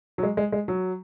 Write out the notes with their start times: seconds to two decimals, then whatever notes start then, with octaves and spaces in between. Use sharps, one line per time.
0.18 F#3
0.23 G#3
0.37 G#3
0.52 G#3
0.68 F#3